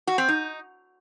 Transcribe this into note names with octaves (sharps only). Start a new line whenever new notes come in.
F#4
C4
D#4